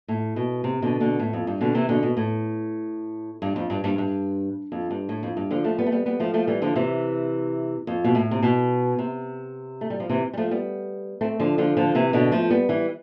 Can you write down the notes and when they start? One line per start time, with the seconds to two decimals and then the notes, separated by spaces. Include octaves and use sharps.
0.08 A2
0.36 B2
0.64 C3
0.82 B2 D3
1.00 B2 D3
1.19 A2
1.33 F2
1.47 G2
1.61 B2 D3
1.75 C3 E3
1.89 B2 D3
2.03 B2
2.17 A2
3.42 G2
3.56 F2
3.70 G2
3.84 G2
3.98 G2
4.72 F2
4.91 G2
5.09 A2
5.23 F2
5.37 G2
5.51 D3 F3
5.64 F3 A3
5.79 G3 B3
5.86 A3
5.92 G3 B3
6.06 G3 B3
6.20 F3 A3
6.34 F3 A3
6.47 E3 G3
6.62 D3 F3
6.76 C3 E3
7.87 F2
8.04 B2
8.15 A2
8.31 C3
8.42 B2
8.99 C3
9.81 A3
9.90 G3
10.00 F3
10.09 C3 E3
10.34 G3
10.37 F3 A3
10.51 G3 B3
11.21 A3 C4
11.40 D3 F3
11.58 D3 F3
11.77 D3 F3
11.95 C3 E3
12.13 B2 D3
12.32 F3 A3
12.50 G3 B3
12.69 E3 G3